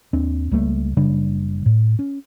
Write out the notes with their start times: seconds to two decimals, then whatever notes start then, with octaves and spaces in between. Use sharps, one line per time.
0.13 D#2 C4 D4
0.51 C#2 G3 A3 A#3
0.97 F#1 C#3 G3 D4
1.66 A2
1.99 C#4